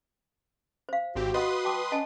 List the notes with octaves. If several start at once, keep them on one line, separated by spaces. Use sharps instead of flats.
C5 F5
G#1 C4 F#4 G4
B4 D#5 F#5 C6 D#6
G5 A5 D6
C#4 D#5 G#5 A5